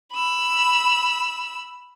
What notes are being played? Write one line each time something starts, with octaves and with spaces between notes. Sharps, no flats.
B5 E6